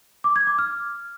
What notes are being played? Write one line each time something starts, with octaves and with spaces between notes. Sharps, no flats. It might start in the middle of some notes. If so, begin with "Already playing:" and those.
D6
G#6
D6
F6